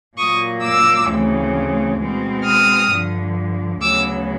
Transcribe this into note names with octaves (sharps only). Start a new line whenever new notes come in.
A#2 F#3 A#3 C#6 D#6
D6 E6
D2 C#3 E3 A3 C4
B2 G#3 C4
D#6 F6
G2 D3 F3
D2 C#3 F#3 B3 D6 E6